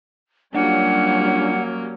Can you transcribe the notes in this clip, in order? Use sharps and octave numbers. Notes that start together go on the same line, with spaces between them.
F#3 G3 A#3 C#4 D4 F4 F#5